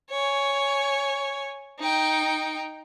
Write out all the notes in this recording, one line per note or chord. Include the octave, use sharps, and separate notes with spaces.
C#5 G#5
D#4 G5